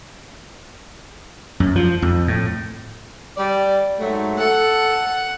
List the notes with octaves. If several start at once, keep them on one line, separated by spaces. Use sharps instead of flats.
F#2
F3
F2
A2
G3 D5
G#2 F#3 A3
A4 F#5